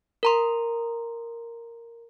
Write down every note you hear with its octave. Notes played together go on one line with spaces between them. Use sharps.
A#4 A#5 C6